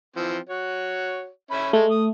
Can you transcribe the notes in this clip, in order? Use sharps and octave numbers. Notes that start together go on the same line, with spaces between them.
E3 F3 C4
F#4 C#5
C#4 E5 B5
G#3 A3
D#6